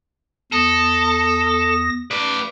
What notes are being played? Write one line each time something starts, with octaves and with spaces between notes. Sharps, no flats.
E2 A4 D#6 A#6
B4 D5